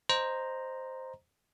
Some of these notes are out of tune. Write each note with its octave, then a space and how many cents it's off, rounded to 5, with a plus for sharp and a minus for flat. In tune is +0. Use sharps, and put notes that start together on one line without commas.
C5 +0 D#5 -10 A#5 +0